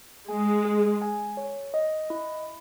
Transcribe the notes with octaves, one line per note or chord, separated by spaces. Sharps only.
G#3 G#5
G#4
G#5
C#5
D#5
E4